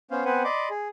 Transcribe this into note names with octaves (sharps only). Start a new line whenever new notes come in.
B3 C#4 C5 F5
B3 C4 B4 C5 F#5 G#5
D5 D#5 B5 C6 D6
G#4